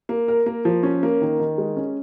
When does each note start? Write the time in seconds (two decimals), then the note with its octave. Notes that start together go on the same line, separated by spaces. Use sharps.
0.09 A#3
0.28 A#4
0.46 A#3
0.65 F3
0.83 C#4
1.03 A#3
1.22 D#3
1.40 D#3
1.58 G#3
1.77 C#4